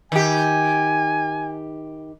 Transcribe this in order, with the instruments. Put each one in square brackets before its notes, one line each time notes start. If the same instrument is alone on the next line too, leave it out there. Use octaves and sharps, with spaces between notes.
[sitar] D#3 G4 [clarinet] G#5